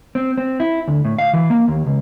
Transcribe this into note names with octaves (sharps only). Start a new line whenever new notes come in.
C4
C4
E4
D2
A2
F5
E3
A#3
D#2
C#2